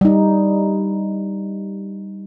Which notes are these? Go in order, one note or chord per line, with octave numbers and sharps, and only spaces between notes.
G3 D#4